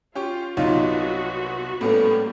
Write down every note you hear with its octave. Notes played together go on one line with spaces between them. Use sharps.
C#4 F4 G4 C#6
C2 F#3 B3 D#4 F4 F#4
A2 G3 A#3 B3 C#4 A4